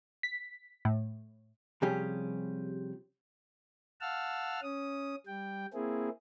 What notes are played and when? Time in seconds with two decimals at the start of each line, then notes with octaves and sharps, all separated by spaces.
0.23 B6
0.85 A2
1.82 C3 F3 G3 C#4 G4 G#4
4.01 F5 F#5 A5 E6 F6
4.62 C#4 D#6
5.27 G3 G5
5.74 A#3 C4 E4 G#4